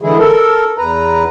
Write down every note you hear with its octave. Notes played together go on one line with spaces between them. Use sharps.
D3 E3 G#3 E4 G#4
A4 A#4
E2 B4 A#5